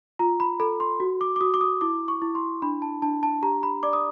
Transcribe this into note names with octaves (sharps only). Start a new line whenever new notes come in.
F4 A#5
B5
A4 B5
C6
F#4
D6
D6
F#4 D#6
D6
D#6
E4 D6
C#6
E4
C6
D4 B5
A5
D4 A5
A5
G4 A#5
B5
D5 D6
D#6